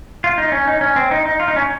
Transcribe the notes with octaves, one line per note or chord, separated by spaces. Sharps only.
F4
D#4
C#4
D#4
C#4
C4
D#4
D#4
F4
D#4
C#4